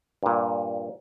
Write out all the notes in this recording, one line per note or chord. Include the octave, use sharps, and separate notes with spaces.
G2 A#2